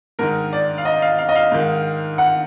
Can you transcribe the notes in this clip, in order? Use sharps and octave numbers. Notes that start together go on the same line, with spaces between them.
G#2 D#3 A#4
D5
F5
D#5
F5
F5
D#5
F5
G#2 D#3
F#5